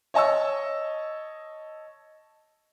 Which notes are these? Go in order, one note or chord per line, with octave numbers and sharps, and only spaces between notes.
C#5 D#5 A5 C#6 E6